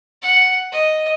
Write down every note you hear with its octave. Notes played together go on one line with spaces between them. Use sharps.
F#5
D#5